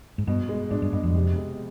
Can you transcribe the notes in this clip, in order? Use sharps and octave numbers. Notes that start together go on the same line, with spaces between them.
G#2
G2 B2
G#3
G#2 D4
G2
G2 B2
F2
C3
G#3